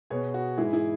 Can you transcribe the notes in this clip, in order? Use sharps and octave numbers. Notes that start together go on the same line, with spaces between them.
B2 B3 G#4 C#5
F#4
G#2 E3 G#3 E4 G#4
E4 G#4